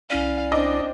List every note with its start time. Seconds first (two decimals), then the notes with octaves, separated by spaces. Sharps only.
0.10 C2 C#4 E4 D5 F5
0.52 C4 D4 D#5 D6